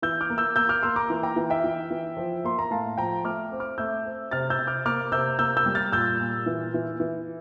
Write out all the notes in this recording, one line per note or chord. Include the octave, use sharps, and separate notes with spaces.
E3 E6 G6
D6 F6
A#3
E6 G6
A#3 E6 G6
D6 F6
A#3 C6 E6
A#5 D6
E3
G5 A#5
E3
E5 G5
E3
E3
F3
A#3 C6
A#5
A2 F5 A5
F3 G5 A#5
A3 D6 F6
C4
D6 F6
A3 E6 G6
C4
C3 F6 A6
E6 G6
C3
D6 F6
A#3 D6 F6
C3 E6 G6
A#3 E6 G6
E6 G6
G3
F6 A6
A#2 E6 G6
A#2
E3
E3
E3